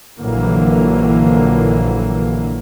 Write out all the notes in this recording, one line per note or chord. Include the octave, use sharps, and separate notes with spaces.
A#1 D3 E3 F#3 A#3